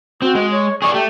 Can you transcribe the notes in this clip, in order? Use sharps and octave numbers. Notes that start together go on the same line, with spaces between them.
C4 F#4
G#3
C#5
G#4 D5 C#6
A3 G4